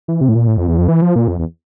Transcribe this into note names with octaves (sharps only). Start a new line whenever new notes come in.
E3
C3
A2
A#2
A2
F2
E2
F2
E3
F3
A#2
F2
E2